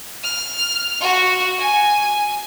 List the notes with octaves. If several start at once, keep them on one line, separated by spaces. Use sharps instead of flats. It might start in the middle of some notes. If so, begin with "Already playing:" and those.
F6
F#4
G#5